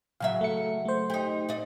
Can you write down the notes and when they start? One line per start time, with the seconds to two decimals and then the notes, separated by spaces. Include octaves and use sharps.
0.20 C#3 F#3 E5 F5
0.41 A3 C#7
0.85 A3 C5
1.10 D#4 G4
1.49 D5 D#5